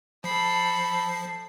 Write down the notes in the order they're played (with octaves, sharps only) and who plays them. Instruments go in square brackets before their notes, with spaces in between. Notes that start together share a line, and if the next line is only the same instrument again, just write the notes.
[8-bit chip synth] F3 C7 [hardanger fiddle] A4 B5